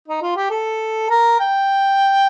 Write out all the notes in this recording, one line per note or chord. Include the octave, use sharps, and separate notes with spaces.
D#4
F4
G4
A4
A#4
G5